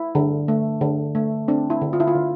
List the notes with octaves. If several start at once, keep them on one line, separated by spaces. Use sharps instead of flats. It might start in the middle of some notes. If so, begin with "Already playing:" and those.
Already playing: E4
D3
A3
D3
A3
C4 D4
E4
D3
F4
E4
F4
D3